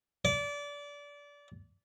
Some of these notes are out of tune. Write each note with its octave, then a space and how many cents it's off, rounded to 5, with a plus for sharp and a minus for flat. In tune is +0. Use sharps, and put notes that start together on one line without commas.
D5 -25